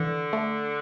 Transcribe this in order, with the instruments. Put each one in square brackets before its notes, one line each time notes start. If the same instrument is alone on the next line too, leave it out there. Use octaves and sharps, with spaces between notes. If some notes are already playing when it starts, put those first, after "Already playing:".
Already playing: [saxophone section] D3 [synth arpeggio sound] E3
[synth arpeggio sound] A3